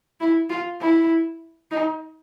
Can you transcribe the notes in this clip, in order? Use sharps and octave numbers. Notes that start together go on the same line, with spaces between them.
E4
F4
E4
D#4